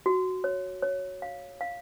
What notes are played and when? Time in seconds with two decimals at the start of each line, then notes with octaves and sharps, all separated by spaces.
0.06 F#4
0.44 C#5
0.82 C#5
1.22 F5
1.61 F5